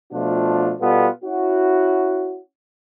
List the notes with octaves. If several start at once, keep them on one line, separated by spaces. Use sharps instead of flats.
B2 F3 A3 D4 F4
B2 G3 B3 F4 A4
C#4 E4 F#4